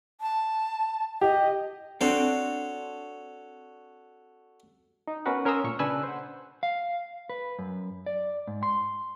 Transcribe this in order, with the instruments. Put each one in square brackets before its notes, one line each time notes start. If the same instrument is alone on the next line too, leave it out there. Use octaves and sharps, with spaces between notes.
[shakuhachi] A5
[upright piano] G4 [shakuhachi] D#5
[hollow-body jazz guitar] C4 D4 [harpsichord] F#4 A4 C#5
[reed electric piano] D#4
B3 C#4 F#4 A#4 B4 F#5
C#4 A#4 C6 D#6 E6
A#2 A3 C#6
C#3 D4 B4 G#5 E6 F#6
C5 F#5
[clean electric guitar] F5
B4
F#2
D5
G#2
C6